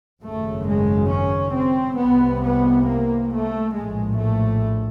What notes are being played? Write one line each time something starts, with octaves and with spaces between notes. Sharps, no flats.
G#1 F#2 C#3 A3
G#3
C#4
C4
C2 C3 B3
B3
A#3
A3
A#1 A2 G#3
A3